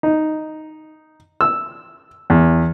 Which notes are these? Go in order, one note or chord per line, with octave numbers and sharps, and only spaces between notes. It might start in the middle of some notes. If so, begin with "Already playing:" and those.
D#4
E6
E2